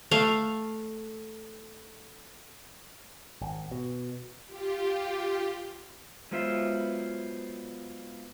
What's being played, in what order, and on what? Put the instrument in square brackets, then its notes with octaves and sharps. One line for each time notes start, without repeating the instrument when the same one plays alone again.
[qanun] A3 F5
[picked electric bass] G#1
B2
[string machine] F4 G4
[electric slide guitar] F#3 G#3 B3 F4 C5 E5